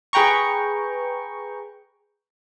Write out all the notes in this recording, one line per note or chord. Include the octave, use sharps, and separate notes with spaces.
G#4 B4 G5 A#5 C#6